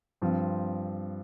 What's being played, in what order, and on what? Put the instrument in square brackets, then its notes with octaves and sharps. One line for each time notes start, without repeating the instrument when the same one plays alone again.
[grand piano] G2 F3 C4